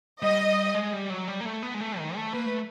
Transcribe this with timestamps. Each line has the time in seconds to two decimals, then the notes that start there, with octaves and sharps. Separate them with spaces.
0.22 G3 D#5
0.74 G#3
0.93 G3
1.10 F#3
1.28 G3
1.41 A#3
1.45 A3
1.63 B3
1.74 G#3
1.81 A3
1.98 D#3
2.16 A3
2.33 A#3 B4
2.46 A3